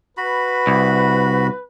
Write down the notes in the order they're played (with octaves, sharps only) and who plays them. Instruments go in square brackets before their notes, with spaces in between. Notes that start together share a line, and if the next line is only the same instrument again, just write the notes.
[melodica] F#4 B5 [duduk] B4
[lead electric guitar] C2